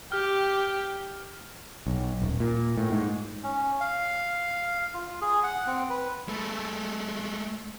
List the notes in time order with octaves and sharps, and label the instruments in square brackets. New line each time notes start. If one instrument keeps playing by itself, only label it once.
[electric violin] G4 [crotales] F6
[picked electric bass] B1
D#1
A#2
A2
G#2
[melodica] C#4
F5
F4
G#4
F#5
C4
B4
[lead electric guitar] G#3 A3